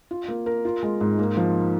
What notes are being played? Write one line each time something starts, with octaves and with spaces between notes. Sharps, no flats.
F4
A#3
A#4
F4
G#3
G#2
A#3
F3